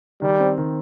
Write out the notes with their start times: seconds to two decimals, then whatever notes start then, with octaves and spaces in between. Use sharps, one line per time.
0.21 D#3 G3
0.40 C4
0.58 D#3